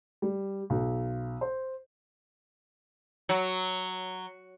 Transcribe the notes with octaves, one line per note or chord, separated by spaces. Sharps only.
G3
B1
C5
F#3